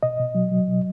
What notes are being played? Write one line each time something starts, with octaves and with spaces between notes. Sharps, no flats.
B2 D#5
B2
F#3
F#3
B2